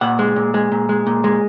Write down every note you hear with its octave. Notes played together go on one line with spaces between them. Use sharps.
A#2 F#5
G#3
A#2
G#3
A#2
G#3
A#2
G#3